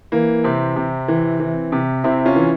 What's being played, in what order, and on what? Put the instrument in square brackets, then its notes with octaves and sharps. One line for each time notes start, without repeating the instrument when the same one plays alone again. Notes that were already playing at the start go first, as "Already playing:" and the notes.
[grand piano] E3 A#3
C3 C4
C3
E3
E3
C3
C3 C4 E4
C#4 F4
E3